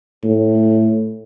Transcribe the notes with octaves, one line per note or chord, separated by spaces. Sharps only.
A2